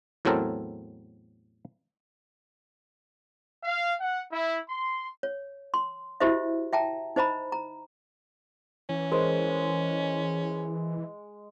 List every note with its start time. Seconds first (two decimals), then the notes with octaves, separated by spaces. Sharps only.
0.25 E2 A2 F#3 C4 A4 A#4
3.64 F5
4.00 F#5
4.31 E4
4.69 C6
5.23 C#5
5.74 C6
6.20 E4 F#4 G4 C5 D#5 E5
6.73 E5 G5 A5 A#5
7.16 D#4 C5 D#5 A#5 B5
7.52 A#5
8.89 E3 C#4
9.12 G#3 A#4 C5